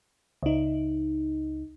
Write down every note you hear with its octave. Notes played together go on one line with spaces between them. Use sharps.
C#2 D#4